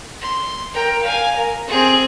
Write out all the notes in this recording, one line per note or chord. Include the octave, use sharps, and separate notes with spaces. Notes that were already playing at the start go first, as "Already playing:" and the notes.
C6
A#4 G5
F5 G#5
A#4
C4 G#4